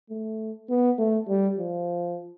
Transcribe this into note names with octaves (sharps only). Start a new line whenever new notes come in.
A3
B3
A3
G3
F3